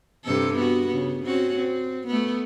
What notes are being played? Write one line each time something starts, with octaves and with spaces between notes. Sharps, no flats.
G2 C3 A4
B3 F#4
C#3 B3
C4 C#4 F#4
C4
A3 B3